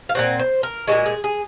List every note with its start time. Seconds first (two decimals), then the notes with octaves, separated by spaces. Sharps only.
0.09 F5
0.15 A#2 F#3 C4 F#5
0.39 C5
0.63 A#4
0.87 A#2 F3 G#3 F#4
1.06 G#4
1.24 G#4